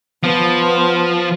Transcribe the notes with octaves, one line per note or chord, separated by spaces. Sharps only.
F3 B3